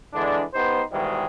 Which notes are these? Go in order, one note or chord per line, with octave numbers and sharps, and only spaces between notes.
D3 E3 G#3 D4
B3 D#4 G4 C5
G#2 B2 D#3 E3 G3 G#3